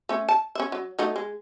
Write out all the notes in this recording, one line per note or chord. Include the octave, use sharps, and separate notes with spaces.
A3 C#4
A5
C#4 E5
F#3
F#3 A3 D#4
G#3